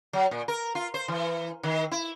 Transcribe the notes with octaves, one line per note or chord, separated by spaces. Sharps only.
F#3
A#2
A#4
F4
C5
E3
D#3
E4